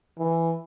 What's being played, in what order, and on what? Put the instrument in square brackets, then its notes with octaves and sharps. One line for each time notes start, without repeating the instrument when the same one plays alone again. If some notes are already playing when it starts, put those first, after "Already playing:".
[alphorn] E3